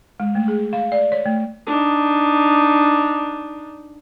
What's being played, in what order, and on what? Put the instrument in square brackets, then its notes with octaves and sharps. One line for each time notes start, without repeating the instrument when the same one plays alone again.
[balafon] G#3
A3
G#4
F5
D5
C#5
A3
[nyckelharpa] D4 D#4